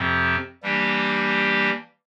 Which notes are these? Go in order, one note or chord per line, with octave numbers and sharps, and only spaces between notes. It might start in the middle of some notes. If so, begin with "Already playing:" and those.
Already playing: F2 C3 F3 C4
E3 G3 A#3 D4 G4